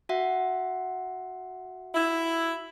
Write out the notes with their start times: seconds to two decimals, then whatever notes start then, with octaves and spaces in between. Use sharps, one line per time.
0.09 F#4 E5 F#5
1.94 E4